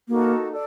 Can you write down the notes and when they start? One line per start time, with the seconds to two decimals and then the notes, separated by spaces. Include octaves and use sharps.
0.08 A#3 D#4 F#4 A4
0.51 A4 D5